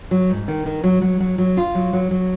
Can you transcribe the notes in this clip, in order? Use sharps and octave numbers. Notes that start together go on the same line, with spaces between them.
F#3
G#2
D#3
D#3
F#3
F#3
F#3
F#3
F4
F#3
F#3
F#3